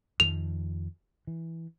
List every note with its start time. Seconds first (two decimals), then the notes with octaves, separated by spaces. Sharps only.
0.20 F2 D#3 F3 F7
1.27 E3